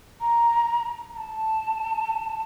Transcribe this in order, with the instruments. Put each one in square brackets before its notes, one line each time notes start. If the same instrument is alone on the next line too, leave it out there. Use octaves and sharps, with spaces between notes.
[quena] A#5
A#5
A5